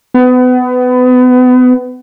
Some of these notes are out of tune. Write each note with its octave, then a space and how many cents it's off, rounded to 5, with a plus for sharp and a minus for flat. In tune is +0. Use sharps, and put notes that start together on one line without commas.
B3 +30